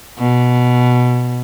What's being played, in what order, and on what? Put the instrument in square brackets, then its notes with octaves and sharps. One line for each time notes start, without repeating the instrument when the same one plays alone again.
[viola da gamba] B2